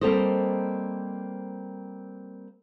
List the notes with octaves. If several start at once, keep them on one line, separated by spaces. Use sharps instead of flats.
G3 A#3 C4 A4 C5 D#5